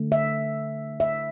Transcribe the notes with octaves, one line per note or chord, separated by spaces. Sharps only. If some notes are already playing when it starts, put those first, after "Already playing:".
Already playing: D3 A3
E5
E5